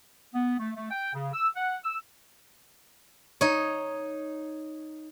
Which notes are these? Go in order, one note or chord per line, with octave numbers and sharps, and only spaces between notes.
B3
A3
A3
G5
C#3
E6
F#5
E6
D#4 C#5